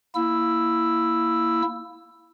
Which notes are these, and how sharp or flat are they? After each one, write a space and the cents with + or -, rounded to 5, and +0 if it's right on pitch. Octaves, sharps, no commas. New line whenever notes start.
A#3 +0 E4 +0 E6 +5